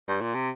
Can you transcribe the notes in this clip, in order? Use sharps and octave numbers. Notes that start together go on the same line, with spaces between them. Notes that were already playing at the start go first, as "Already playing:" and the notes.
G2
A#2
C3